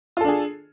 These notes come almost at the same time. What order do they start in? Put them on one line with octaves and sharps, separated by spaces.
F4 A4 D4 G#4